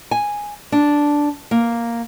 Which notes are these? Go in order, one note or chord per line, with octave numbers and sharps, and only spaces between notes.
G#5
D4
A#3